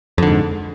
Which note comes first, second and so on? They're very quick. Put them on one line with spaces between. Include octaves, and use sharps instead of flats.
F2 D3 G#2